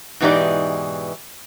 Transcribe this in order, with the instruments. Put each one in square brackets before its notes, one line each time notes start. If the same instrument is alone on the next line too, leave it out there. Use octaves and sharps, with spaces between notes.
[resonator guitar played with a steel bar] G#2 B2 E3 D#4 G4 D5